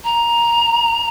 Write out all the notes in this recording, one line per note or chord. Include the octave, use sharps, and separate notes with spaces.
A#5